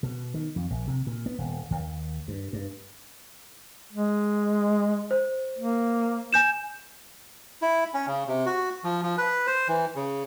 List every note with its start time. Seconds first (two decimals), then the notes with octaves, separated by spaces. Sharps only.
0.03 B2
0.34 D#3
0.56 F2
0.70 A#1
0.87 C3
1.07 A#2
1.26 B3
1.38 D#1
1.71 D#2
2.28 G2
2.53 G2
3.93 G#3
5.11 C5
5.58 A#3
6.33 G#5 G6 E7
7.62 E4
7.94 C#4
8.07 C#3
8.28 C3
8.46 F#4
8.84 F3
9.03 F3
9.18 B4
9.47 C5
9.68 E3
9.96 C#3